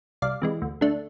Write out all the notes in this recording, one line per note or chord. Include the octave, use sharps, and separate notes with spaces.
C2 D5 F5
C3 E3 G#3
D2
D3 A3 D4